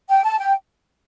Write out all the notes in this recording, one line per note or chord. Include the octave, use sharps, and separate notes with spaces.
G5
A5
G5